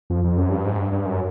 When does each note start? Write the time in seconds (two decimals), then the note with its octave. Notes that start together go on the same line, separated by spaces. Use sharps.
0.10 F2
0.24 F2
0.37 F#2
0.51 G2
0.65 G#2
0.78 G2
0.92 G2
1.06 F#2